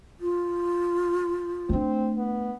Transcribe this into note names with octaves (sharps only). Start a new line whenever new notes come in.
F4
A3 C4 D4
B3